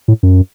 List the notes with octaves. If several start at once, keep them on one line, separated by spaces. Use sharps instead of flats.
A2
F#2